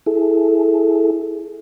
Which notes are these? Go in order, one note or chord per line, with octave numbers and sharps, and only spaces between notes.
E4 G#4 A4